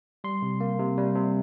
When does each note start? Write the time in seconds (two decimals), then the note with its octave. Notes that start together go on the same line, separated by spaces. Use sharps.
0.24 G3 C6
0.42 C3
0.60 A#3
0.79 C3
0.97 G3
1.15 C3